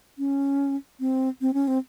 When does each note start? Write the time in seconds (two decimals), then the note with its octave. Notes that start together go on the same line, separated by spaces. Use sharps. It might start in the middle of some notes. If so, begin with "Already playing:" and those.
0.18 C#4
1.00 C4
1.41 C4
1.54 C#4
1.67 C4